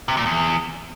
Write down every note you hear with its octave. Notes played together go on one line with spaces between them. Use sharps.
C3
A#2
E2